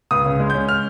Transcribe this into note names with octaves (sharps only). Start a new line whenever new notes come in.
C#2 D#6
C#3
G#3
C#4 G6
F6